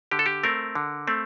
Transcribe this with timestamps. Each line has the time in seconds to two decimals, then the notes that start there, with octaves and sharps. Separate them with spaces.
0.11 D3 G4
0.19 A4
0.26 G4
0.44 A3 C4 A#4
0.75 D3
1.07 A3 C4